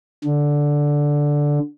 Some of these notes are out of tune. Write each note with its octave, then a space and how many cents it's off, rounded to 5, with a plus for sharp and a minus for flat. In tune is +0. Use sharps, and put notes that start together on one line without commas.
D3 -5